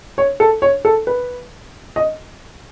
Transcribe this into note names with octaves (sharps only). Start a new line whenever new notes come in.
C#5
A4
C#5
A4
B4
D#5